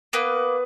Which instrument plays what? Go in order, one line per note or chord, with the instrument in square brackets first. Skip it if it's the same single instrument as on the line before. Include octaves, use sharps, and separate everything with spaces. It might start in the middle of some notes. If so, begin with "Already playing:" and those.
[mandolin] A#3 B3 B4